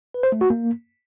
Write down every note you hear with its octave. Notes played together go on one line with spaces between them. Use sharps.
B4
C5
A3
F#4
A#3